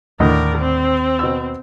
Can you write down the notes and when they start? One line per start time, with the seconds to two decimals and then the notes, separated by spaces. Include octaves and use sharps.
0.20 D#2 A2 D3 A#4 D5 D#5
0.57 C4
1.19 B2 E6